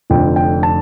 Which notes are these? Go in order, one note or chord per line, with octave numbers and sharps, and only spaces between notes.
F1 F2 D3 F3 G5
G5
A5